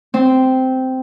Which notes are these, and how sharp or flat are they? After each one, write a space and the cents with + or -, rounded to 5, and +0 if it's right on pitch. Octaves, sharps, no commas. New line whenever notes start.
C4 -10